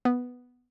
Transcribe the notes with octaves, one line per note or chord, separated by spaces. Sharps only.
B3